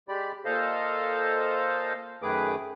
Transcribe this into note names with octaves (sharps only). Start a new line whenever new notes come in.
G#3 G4 D5 B5
A#2 A4 C5 D#5 F5
F#2 D#3 A3 G#4 B4 D6